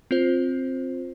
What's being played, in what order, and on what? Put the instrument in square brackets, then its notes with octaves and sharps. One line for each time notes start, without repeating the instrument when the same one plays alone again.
[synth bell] C4 F4 C5